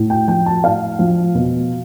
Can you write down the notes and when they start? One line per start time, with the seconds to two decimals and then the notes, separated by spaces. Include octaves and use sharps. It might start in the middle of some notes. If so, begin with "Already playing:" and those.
Already playing: A2
0.10 G5
0.27 F3 G5
0.46 A5
0.64 A2 F5
0.99 F3
1.35 B2